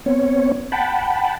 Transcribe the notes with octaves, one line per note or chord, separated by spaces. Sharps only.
B3 C4 C#5
F#5 G5 A5 B5